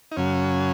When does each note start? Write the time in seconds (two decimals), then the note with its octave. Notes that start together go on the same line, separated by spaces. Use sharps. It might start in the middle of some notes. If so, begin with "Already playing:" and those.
0.12 D#4
0.17 F#2 C#3 F#3 C#4